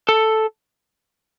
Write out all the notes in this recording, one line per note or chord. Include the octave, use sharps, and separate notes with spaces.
A4